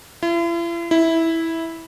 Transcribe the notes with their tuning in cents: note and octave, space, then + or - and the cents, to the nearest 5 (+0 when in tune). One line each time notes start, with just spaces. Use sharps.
E4 +45
E4 -10